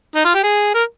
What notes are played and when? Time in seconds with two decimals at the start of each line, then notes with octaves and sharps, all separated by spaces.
0.15 D#4
0.25 F4
0.34 G4
0.43 G#4
0.74 A#4